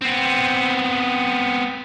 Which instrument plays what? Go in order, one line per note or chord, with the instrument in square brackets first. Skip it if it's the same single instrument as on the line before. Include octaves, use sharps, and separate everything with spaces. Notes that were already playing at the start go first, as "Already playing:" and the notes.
[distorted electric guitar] B3 C4